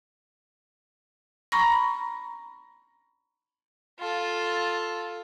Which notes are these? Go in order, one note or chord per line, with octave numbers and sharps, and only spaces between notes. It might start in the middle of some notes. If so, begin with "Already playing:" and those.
A#5 B5 C#6 A#6
F4 A4